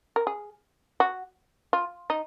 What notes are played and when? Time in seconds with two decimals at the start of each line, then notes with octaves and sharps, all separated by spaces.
0.16 A#4
0.27 G#4
1.00 F#4
1.73 F4
2.10 D#4